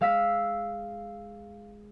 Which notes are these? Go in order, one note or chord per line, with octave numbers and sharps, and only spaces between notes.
G#3 F5 E6 B6